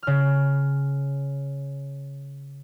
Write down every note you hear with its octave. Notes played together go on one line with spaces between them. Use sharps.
C#3 F6